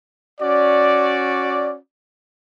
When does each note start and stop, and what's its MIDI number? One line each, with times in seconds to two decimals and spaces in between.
0.41 1.78 61
0.41 1.78 66
0.41 1.78 74